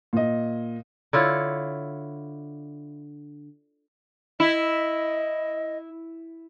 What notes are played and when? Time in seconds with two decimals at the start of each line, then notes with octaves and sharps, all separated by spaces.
0.13 A#2 D#5
1.13 D3 E4 F4 C#5
4.40 E4 D#5